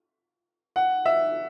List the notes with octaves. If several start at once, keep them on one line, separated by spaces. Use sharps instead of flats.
F#5
E5